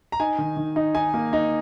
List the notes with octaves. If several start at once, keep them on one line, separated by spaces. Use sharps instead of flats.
A#5
D#4 G#5
D#3
D#3
D#4
D#4 G#5
A#3
D#4